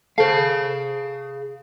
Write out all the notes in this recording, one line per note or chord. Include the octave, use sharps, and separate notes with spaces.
G#4 A4 C5 F5